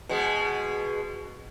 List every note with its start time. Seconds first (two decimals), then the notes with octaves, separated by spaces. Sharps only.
0.09 B2 G#3